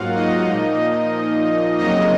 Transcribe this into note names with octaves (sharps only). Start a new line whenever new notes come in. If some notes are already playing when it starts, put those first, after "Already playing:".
Already playing: G#2 F#3 A#3 F4 F#4 F5 F#5
D#4 D#5
A#2 F3 A#3
F2 C#3 F#3 A#3 D#4 D#5